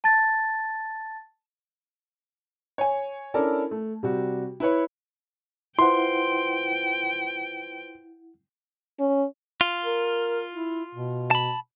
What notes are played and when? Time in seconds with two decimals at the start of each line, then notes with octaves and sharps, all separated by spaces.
0.04 A5 A6
2.78 C#5 G#5
3.34 C#4 D4 E4 A4 A#4 D5
3.71 A3
4.03 C3 G3 F#4
4.60 E4 B4 C#5
5.79 E4 F4 B4 C5 F#5 G5 C6
9.00 C#4
9.61 F4
9.85 A#4
10.53 E4
10.95 B2
11.31 A5 B5